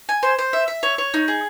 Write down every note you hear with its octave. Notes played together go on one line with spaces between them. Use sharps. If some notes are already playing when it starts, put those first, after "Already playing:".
G#5
C5
C5
E5
E5
C#5
C#5
D#4
G#4